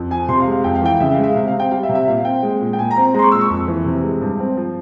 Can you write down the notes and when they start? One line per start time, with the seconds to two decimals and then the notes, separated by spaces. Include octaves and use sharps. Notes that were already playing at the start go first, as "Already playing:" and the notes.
Already playing: F2
0.10 F3 G#5
0.28 C3 C6
0.40 F5
0.47 G#3
0.52 F5
0.64 F2 G5
0.75 F5
0.82 E3 G5
1.00 C#3 E5
1.12 F5
1.18 G#3
1.23 E5
1.35 C3 F5
1.48 F5
1.53 C4
1.60 G5
1.71 G3 F5
1.83 E5
1.89 C3
1.95 E5
2.07 A#2 F5
2.17 F5
2.25 C4 G5
2.43 G#3
2.61 A#2
2.73 G5
2.78 A#2 G#5
2.91 A#5
2.96 C4
3.14 G#3 A#5
3.19 C6
3.23 C#6
3.32 A#2 E6
3.41 C#6
3.50 F2
3.68 E3
3.86 C3
4.04 G#3
4.21 G2
4.39 C4
4.57 F3